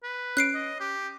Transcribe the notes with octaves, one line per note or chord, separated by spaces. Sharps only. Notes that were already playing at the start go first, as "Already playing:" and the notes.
B4
C#4 F#6 C7 D7
D#5
G4